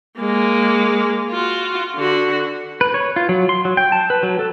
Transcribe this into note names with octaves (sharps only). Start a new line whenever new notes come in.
G#3 A#3
F4 F#4
D3 F#4
B4
C#5
F4
F#3
C6
F#3
G5
A5
B4
F#3
A4